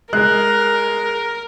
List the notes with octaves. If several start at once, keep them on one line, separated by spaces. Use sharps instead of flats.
G#3 A#4 F#6